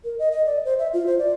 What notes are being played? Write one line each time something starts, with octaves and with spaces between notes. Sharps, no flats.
A#4
D#5
D#5
D5
C5
E5
F4
C5
D5